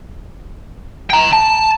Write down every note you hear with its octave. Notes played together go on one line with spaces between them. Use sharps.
G5 A#5
A5